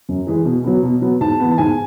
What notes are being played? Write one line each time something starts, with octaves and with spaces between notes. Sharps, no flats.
F#2
E3 G#3
B2
F#3 B3
B2
F#3 B3
G#2 A5
E3 B3
A5
G#2 G#5